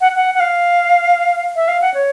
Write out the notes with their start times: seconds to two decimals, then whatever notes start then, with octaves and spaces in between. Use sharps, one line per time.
0.01 F#5
0.16 F#5
0.35 F#5
0.40 F5
1.56 E5
1.68 F5
1.81 F#5
1.94 C#5